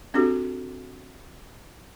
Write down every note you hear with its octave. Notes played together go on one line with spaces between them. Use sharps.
C4 D4 F#4 G4 A4